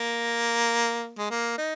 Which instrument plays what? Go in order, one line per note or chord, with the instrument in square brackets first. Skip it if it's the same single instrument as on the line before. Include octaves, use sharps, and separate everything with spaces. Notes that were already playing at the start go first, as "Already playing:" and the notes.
Already playing: [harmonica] A#3
G#3
A#3
D#4